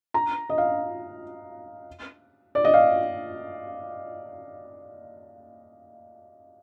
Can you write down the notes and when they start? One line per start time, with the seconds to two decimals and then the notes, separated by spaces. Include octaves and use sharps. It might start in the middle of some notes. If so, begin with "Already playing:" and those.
0.14 A#5
0.49 D#5
0.58 F5
2.55 D5
2.65 D#5
2.74 F5